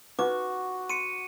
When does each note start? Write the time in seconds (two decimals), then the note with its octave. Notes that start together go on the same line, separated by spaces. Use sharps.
0.19 D#4 F4 F#4 B4 D6
0.90 C6 C#7 D#7